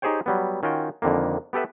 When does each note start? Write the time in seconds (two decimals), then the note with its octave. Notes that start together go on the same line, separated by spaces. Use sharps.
0.02 D#4 G4 G#4 C5 C#5 G5
0.26 F#3 G3 B3
0.63 D#3 C#4 F4 F#4 G5
1.02 F2 D3 D#3 A#3
1.53 B3 G4 A4 B4 E5